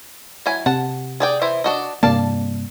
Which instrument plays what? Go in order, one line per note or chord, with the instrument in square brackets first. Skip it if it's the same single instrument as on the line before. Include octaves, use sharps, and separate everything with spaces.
[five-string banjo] F#3 E4 G#5
[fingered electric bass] C3 [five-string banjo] F#5 A5
[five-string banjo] G#4 D5 G5
E3 E4 C5
D4 F#4 D#5
[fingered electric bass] G2 C3 A#3 [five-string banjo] D5 F5 A5